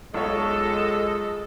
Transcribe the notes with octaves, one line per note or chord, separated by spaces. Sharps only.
B1 G#3 F4 A4 C#5 D#5